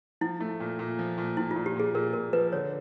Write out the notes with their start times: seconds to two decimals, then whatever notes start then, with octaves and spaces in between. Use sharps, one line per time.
0.21 F3 E4
0.41 A3
0.60 A#2
0.79 A#2
0.99 F3
1.18 A#2
1.37 A#2 E4
1.51 A#2 F4
1.66 G4
1.76 A#2 G#4
1.95 A#2 A#4
2.13 A#2 A#4
2.33 F3 B4
2.52 D3 C#5